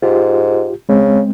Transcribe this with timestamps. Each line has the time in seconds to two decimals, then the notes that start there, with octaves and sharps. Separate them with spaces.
0.03 G#2 F4 G4
0.89 C#3 G#3 C4